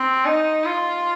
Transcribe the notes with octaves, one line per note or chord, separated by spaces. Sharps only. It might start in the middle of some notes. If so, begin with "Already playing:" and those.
Already playing: C4
D#4
F4